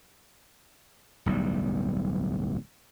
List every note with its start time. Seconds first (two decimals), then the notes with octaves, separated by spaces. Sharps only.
1.26 D1 B1 E2 G3